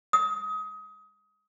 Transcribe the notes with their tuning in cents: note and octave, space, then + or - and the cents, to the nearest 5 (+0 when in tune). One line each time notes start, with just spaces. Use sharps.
D#6 +25